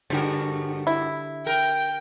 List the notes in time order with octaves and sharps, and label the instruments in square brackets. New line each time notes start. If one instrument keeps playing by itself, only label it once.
[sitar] G2 F#4 A#4 [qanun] D3 G3
[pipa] E4
[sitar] A#4 [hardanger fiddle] G5